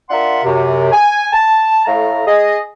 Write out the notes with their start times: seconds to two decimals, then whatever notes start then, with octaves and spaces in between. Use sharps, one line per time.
0.10 D4 F4 A#4 E5 F#5 C6
0.44 F#2 C3
0.92 G#5
1.33 A5
1.86 A2 A3 F5 A#5
2.27 G#4 D#5